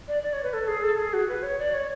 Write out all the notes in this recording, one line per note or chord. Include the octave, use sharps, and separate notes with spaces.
D5
D5
C#5
B4
A4
G#4
A4
G#4
F#4
B4
C#5
D5
C#5